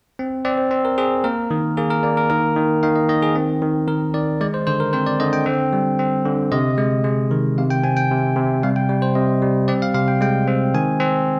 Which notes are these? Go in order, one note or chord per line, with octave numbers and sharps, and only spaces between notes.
C4
C4 D5
C5
C4
A#4
C4 G#4
A#3 A#4
D#3
A#3 G#4
A#4
A#3 D5
A#4
D#3 A#4
D#3
D#3 F5
D#5
D#3 D#5
G#4
C4
D#3
D#3 A#4
D#3 D5
G#3 D5
C5
D3 C5
A#4
C4 C5
D5
D3 D#5
G5
C4
G3
C4
D3
C3 D#5
G#3
G#3
D#3
C3 F5
G5
C4 G#5
G5
C3
C3
G3 F5
G5
G3
C5
C3 D#5
G3
C4 D5
F5
C3 F5
G5
G#3 G5
C4
D#3 G#5
C4